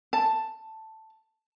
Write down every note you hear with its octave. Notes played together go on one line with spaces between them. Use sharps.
A5